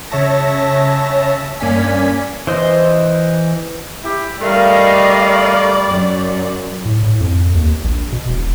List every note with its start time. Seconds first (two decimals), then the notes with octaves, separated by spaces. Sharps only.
0.11 C#3 C#5 E5 A5 A#6
1.60 G2 A#3 C#4 D5 G#5 B6
2.47 E3 C5 D#5
4.04 E4 G4
4.41 G3 A3 A#4 D5 D#5 F5
5.91 F#2
6.85 A2
7.03 A2
7.21 F2
7.54 D#2
7.84 A#1
8.13 B2
8.29 E1